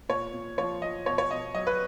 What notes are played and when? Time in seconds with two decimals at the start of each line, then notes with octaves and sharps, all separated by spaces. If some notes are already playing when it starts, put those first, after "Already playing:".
0.09 A#2 C#5
0.33 A#2
0.58 F3 C#5
0.82 F3 D#5
1.06 B2 C#5
1.18 C#5
1.30 B2 D#5
1.54 F#3 D#5
1.67 B4